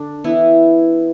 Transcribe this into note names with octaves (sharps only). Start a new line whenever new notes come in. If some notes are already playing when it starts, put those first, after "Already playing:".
Already playing: D3 D4
E3 B3 E4